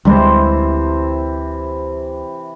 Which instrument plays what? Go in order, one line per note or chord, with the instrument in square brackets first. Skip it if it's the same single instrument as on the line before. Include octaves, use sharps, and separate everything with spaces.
[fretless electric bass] D2 G3 G#3 [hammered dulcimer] C3 E3 C5